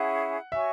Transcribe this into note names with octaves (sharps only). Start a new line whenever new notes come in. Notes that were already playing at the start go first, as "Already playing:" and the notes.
Already playing: C#4 E4 G#4 F#5
F#4 C#5 E5 G#5 C#6